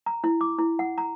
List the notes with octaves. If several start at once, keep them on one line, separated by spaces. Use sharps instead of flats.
A#5
E4
D6
E4
F#5
A#5